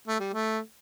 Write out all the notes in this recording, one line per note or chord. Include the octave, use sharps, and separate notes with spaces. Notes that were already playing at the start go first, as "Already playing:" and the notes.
A3
G3
A3